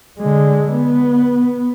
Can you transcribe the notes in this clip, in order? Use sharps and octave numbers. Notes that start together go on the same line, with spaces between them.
D3 G#3
B3